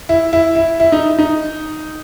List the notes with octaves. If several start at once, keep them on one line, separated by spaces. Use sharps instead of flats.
E4
E4
E4
E4
D#4
D#4